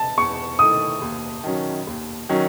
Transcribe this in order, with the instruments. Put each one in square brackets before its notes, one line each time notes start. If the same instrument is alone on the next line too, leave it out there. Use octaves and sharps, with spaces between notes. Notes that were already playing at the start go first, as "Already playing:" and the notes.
Already playing: [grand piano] A5
[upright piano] E2 [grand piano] C#6
[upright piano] D#3 A3 E4 [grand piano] D#6
[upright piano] D#2
D#3 F#3 C#4
D#2
D#3 F#3 C#4